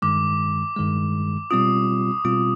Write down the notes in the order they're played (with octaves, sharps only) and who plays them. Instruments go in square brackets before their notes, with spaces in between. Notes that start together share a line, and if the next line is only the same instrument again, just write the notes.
[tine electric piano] G2 D#3 G#3 [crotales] D6
[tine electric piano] G2 D#3 G#3
[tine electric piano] B2 G3 C4 F4 [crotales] D#6
[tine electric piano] B2 G3 C4 F4